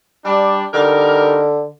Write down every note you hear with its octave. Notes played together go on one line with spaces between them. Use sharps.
G3 D4
D3 G3 D#4 A#4